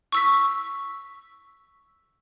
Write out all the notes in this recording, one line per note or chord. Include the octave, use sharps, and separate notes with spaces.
C#6 E6 B6